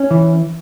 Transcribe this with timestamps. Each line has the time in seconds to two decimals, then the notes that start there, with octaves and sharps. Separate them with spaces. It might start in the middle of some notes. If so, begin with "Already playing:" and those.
Already playing: C#4
0.11 E3